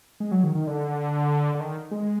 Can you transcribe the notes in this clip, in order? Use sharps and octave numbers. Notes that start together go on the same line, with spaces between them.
G#3
F#3
D#3
D#3
D3
D3
D#3
G#3